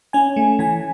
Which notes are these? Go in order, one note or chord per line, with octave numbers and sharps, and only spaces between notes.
C#4 G#5
A3
E3 G#5